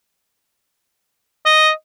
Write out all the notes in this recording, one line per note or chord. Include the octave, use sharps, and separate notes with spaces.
D#5